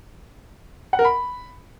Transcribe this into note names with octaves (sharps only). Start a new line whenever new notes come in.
F#5
A#4
B5